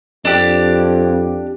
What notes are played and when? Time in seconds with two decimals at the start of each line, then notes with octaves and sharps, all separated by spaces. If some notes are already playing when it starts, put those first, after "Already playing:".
0.25 F2 D4 G4